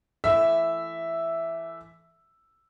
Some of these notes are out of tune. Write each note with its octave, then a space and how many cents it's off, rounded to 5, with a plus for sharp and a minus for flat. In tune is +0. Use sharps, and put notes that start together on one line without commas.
E3 +20 A3 +5 E5 +0